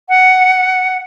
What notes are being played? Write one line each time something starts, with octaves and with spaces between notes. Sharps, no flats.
F#5